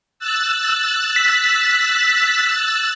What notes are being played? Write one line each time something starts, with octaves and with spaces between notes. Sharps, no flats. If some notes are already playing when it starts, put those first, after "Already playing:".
E6 F#6 A6
B6